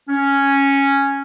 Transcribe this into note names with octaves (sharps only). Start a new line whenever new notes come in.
C#4